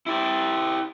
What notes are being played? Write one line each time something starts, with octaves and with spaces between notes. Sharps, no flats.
E4 G4